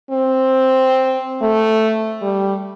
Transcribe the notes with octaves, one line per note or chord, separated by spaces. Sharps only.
C4
A3
G3